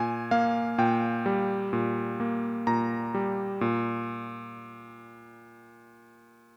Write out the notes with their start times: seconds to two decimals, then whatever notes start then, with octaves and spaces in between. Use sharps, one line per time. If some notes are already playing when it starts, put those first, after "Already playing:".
Already playing: A#2 G#5
0.31 A#3 F5
0.78 A#2 G5
1.26 G3
1.73 A#2
2.20 A#3
2.67 A#2 A#5
3.14 G3
3.61 A#2